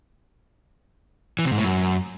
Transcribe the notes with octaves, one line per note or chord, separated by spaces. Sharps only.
E3
C3
G#2
A2
F#2